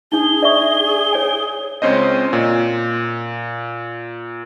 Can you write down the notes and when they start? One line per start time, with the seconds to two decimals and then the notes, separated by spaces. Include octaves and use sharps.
0.12 D4 D#4 G#4 G7
0.42 D5 E5 C#6
1.13 C#5 G#5
1.82 C#2 C4 C#4 C5 D#5
2.33 A#2